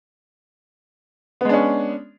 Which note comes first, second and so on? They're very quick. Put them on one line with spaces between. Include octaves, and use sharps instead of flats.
B3 G#3 D4 C#4